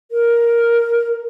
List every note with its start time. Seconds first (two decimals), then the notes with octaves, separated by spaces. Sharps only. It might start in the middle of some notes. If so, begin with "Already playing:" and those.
0.11 A#4